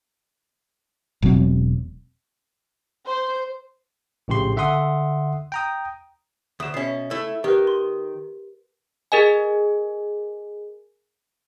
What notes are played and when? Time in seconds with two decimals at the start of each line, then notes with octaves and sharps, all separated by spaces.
1.22 E1 B2 F#3 C4
3.07 C5
4.28 A#1 A2 C#3 G4 C6
4.56 D3 E5 F#5 C6 D#6
5.52 G5 A#5 D#6
6.60 D2 D#6 E7
6.74 B2 C#4 E5 C7
7.11 A3 E4
7.44 D#3 G4 A#4 B4
7.67 C6
9.12 G#4 A#4 D#5 G#5